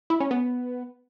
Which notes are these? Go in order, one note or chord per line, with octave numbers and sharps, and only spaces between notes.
E4
C#4
B3